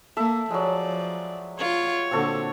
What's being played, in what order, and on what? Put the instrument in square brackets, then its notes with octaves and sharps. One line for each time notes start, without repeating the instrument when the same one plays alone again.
[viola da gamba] A#3 [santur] A4 E5 B5
[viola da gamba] F3 [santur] F#3 G#3 [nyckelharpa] D5
[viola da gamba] F4 [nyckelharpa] C#5
[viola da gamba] A#2 D3 [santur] C4 F#4 A4